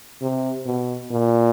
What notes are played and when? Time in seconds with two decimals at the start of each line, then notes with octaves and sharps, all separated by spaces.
0.22 C3
0.66 B2
1.11 A#2